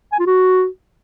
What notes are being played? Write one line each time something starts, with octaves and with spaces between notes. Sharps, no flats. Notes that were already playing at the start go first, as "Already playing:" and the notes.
G#5
F4
F#4